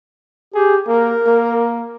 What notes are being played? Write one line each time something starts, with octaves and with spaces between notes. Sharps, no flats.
G4 G#4
A#3 A#4
A#3